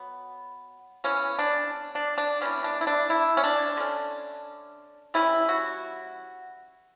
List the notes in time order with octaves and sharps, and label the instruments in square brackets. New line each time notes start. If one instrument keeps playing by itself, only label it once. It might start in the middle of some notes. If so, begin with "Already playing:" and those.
Already playing: [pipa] F#3 B3
C#3 E3 B3 C#4
D4
D4
D4
E3 G3 B3 C#4
D4
E4
D4
E4
C#4
D4
D3 A3 C#4
E3 G3 C#4 E4
F#4